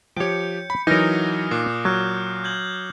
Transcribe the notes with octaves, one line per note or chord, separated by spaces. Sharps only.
F3 G4 C#5 G5 G6 C#7
B5
E3 F#3 D#4 A#4 D#6 F6 A#6
A#2 D6 F#6 C7
F#3 F6 G6
G6 G#6 F#7